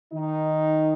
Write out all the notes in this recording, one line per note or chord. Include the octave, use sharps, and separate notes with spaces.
D#3 D#4